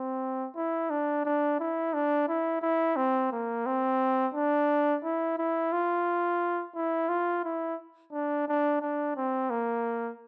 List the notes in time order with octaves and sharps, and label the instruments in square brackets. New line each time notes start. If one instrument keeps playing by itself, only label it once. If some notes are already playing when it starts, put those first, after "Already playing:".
Already playing: [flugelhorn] C4
E4
D4
D4
E4
D4
E4
E4
C4
A#3
C4
D4
E4
E4
F4
E4
F4
E4
D4
D4
D4
C4
A#3